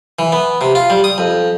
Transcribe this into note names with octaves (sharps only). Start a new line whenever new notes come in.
E3
B3
C3
F4
G3
D#6
F2